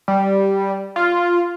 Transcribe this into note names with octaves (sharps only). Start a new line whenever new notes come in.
G3
F4